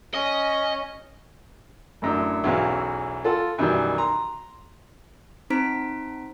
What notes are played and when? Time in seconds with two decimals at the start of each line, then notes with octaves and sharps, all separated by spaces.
0.14 C#4 D#5
2.02 A1 F#2 D3 E4
2.44 B1 E2 E3 C#4 F#4 F5
3.24 F4 A4 F#5
3.58 F#2 B2 D#3 E3 G3
3.98 A#5 C6
5.50 C4 D#4 C5 A#5 B6 D7